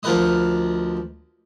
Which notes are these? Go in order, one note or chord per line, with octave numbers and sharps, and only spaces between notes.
D2 F3 A#4 B4 D#5 D#6